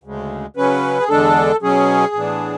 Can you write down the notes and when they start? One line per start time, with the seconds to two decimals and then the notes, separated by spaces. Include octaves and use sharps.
0.04 D2 C#3 G#3
0.56 C#3 F#3 C#4 B4
1.00 G#4
1.09 E2 D3 G#3 D4 A4
1.62 B2 F#3 C#4 G#4
2.15 A2 E3 B3 D4